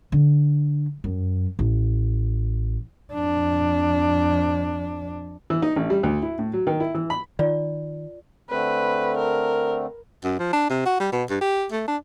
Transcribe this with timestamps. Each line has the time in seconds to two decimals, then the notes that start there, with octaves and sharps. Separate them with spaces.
0.12 D3
1.04 F#2
1.59 A1
3.13 F2 D4
5.50 E3
5.62 D#4
5.76 A1
5.90 G3
6.03 D2
6.23 E4
6.39 A2
6.53 F#3
6.67 D#3
6.80 E4
6.95 E3
7.10 B5
7.39 D#3 F4 D5
8.50 D3 A3 C4 B4
9.17 A#4
10.24 F#2
10.39 F3
10.53 D4
10.70 C3
10.86 F#4
11.00 G3
11.13 B2
11.30 G2
11.41 G4
11.72 A3
11.88 D4